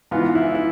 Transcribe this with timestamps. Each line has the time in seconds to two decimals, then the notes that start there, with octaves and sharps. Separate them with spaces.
0.11 G#2 E3 B3 F4
0.35 E4
0.55 E4